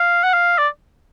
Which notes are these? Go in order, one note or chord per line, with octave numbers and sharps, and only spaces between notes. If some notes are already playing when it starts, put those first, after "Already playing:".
Already playing: F5
F#5
F5
D5